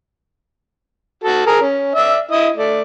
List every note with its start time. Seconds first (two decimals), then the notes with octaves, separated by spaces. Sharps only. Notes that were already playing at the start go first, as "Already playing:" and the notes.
1.24 F#4 A4
1.46 G#4 A#4
1.61 C#4
1.95 D5 E5
2.31 E4 D#5
2.56 A3 D5